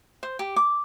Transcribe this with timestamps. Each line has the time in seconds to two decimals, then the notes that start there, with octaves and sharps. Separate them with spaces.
0.23 C5
0.39 G4
0.56 D6